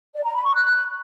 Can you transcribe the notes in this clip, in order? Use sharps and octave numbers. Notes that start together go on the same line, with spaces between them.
D5
A#5
B5
C#6
F#6